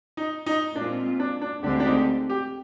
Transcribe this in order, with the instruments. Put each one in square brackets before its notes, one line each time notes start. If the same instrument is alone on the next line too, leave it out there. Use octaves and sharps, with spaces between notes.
[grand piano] D#4
D#4
[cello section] A#2 G#3 C4 F4 [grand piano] D4
[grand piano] D4
D4
[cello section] D2 D3 G#3 C4 G4 [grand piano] D4
[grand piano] D4
D#4
G4